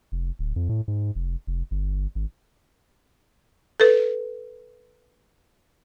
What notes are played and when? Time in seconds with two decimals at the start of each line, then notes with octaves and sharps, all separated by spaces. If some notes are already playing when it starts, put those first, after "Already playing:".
0.12 F1
0.39 D1
0.56 F2
0.69 A2
0.88 G#2
1.15 F1
1.47 F1
1.71 G1
2.15 G#1
3.80 A4 B4